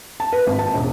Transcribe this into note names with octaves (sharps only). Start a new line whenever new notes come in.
A5
B4
G#1
A5
E1